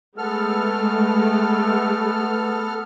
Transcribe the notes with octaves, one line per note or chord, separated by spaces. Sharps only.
G#3 A3 B3 A4 F6